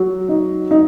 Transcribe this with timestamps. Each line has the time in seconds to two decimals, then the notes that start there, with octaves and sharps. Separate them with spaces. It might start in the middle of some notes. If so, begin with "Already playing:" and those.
Already playing: F#3
0.29 D#4
0.71 D#4